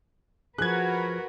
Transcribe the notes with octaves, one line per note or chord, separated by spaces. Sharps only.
F3 F#4 G#4 A#4 B4 F#6 G#6